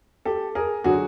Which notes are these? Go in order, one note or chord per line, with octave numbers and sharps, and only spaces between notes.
G4 A4
G#4 A#4
D3 F#3 F#4 G#4